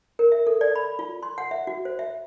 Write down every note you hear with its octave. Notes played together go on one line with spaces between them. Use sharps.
A#4
E5
A4
D5
B5
F4
C6
F#5
E5
F#4
C5
E5